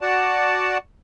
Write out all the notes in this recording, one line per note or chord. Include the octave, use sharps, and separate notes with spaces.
F#4 D5 F#5 A5